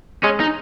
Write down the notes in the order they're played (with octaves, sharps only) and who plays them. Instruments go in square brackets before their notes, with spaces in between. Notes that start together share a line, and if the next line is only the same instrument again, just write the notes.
[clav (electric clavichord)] G#3 [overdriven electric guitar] C#4
[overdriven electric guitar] D#4